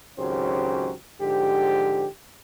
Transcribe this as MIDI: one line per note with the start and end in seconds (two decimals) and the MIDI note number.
0.18 0.92 32
0.18 0.92 37
0.18 0.92 54
0.18 0.92 61
0.18 0.92 67
0.18 0.92 72
1.21 2.06 44
1.21 2.06 50
1.21 2.06 53
1.21 2.06 67